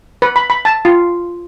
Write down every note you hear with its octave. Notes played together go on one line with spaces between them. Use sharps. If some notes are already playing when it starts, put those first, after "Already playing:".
B4
B5
B5
A5
F4